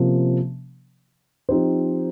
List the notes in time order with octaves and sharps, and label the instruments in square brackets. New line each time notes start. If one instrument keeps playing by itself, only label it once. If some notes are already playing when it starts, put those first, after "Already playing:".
Already playing: [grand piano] C3 F3 A#3 C#4
F3 C4 D#4 G4 C5